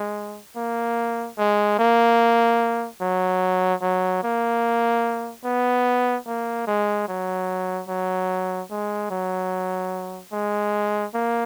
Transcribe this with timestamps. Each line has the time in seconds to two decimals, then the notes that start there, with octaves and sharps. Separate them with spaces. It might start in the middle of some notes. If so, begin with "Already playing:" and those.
Already playing: G#3
0.56 A#3
1.38 G#3
1.79 A#3
3.01 F#3
3.82 F#3
4.23 A#3
5.44 B3
6.26 A#3
6.67 G#3
7.08 F#3
7.88 F#3
8.70 G#3
9.10 F#3
10.32 G#3
11.14 A#3